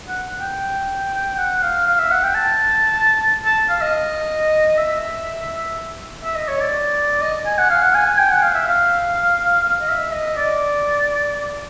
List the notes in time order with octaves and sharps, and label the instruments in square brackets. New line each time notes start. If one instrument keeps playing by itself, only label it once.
[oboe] F#5
G5
F#5
F5
F5
E5
F#5
G5
A5
A5
F5
D#5
E5
E5
D#5
C#5
D5
D#5
G#5
F#5
F5
F#5
G#5
G#5
G5
F#5
F5
E5
F5
F5
D#5
E5
D#5
D5